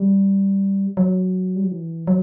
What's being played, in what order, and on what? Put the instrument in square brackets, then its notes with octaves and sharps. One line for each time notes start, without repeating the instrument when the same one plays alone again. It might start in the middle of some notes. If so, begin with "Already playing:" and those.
Already playing: [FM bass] G3
F#3
G3
F#3
E3
F#3